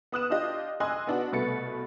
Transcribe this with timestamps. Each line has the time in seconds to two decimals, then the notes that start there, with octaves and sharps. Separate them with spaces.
0.12 B3 D#6 F#6 E7
0.30 D4 F4 G4 D#5
0.80 D#5 G#5 C6 E6 F#6
1.07 B3 D4 F#4
1.32 C2 B2 A3 B4 A6 C#7